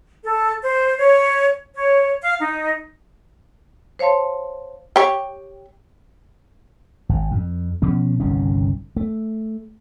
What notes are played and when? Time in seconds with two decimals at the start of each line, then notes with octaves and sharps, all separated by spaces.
0.23 A4
0.62 C5
0.97 C#5
1.74 C#5
2.23 F5
2.40 D#4
3.99 C5 C#5 F5 A5 C6
4.96 G4 C#5
7.09 G#1
7.31 F2
7.82 B2 F3 C#4
8.20 G1 C2 D#3 C#4
8.96 A3